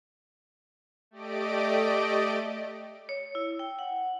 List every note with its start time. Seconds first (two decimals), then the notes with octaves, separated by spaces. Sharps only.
1.11 A3 G4 D5 D#5 D7
3.09 C#5
3.35 E4
3.59 G5
3.79 F#5